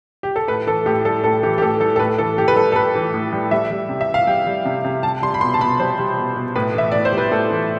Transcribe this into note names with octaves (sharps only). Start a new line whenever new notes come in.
G4
A4
A2 B4
E3 A4
A2 G4
G3 A4
A2 A4
E3 G4
G4
A2 A4
G3 A4
A4
A2 B4
E3 A4
A2 G4
B4
G3 A4
A4
A2 B4
E3
A2
G3
G3 E5
G3
C3
E5
C3
F5
G3 G5
G3
C3
C3
G3 A5
G3 C6
B5
B2 C6
A5
B2 B5
G3 C5
G3
B2
B2
A2 B4
E3 E5
A2 D5
C5
G3
B4
A2 A4
E3